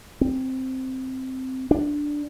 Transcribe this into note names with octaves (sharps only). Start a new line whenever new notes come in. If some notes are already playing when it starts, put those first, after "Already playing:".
C4
D4